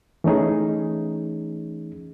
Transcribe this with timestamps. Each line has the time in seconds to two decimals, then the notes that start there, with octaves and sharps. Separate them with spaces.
0.24 E3 A3 C#4 D#4 G#4